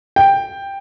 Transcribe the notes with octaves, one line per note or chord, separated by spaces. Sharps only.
G5